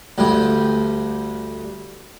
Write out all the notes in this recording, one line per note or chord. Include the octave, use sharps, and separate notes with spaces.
D2 G2 G3